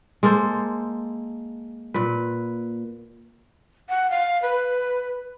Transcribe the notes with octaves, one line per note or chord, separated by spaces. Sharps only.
G#3 A#3 A4 C5
A#2 B4
F#5
F5
B4